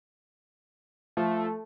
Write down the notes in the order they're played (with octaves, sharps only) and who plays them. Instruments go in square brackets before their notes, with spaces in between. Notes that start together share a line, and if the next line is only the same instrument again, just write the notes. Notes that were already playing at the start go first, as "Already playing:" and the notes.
[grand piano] F3 [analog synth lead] A3